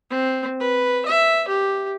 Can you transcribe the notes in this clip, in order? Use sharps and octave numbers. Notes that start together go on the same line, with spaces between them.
C4
B4
E5
G4